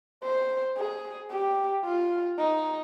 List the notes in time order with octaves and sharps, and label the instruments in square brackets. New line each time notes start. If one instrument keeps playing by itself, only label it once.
[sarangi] C5
G#4
G4
F4
D#4